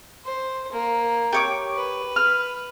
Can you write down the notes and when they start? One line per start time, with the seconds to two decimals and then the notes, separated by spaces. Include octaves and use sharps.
0.25 C5
0.72 A#3
1.33 G4 C#5 D6
1.75 B4
2.16 F6